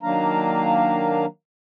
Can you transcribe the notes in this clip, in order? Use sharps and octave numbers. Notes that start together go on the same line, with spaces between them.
D#3 F#3 A#3 D4 F5 A#5